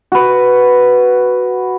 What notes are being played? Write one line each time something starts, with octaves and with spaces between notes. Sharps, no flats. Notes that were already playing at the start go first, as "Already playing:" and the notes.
F#4 B4